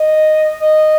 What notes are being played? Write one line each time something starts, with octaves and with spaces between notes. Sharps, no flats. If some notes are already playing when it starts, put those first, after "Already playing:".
Already playing: D#5
D#5